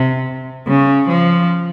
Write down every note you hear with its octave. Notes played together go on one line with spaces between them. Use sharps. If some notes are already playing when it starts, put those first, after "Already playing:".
Already playing: C3
C#3
F3